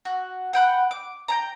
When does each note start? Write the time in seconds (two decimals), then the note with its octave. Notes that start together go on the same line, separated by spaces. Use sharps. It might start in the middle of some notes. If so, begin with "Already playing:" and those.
0.05 F#4
0.53 F#5 G5 B5 F#6
0.91 D6
1.28 G5 A5 A#5